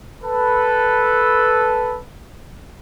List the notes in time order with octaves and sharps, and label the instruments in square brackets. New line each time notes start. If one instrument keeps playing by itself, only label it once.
[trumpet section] A4 B4